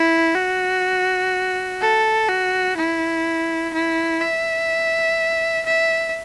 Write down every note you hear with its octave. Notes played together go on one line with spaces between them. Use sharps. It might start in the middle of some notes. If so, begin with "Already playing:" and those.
Already playing: E4
F#4
A4
F#4
E4
E4
E5
E5